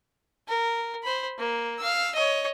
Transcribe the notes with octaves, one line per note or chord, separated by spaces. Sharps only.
A#4
C5 B5
A#3
F5 E6
C#5 D#5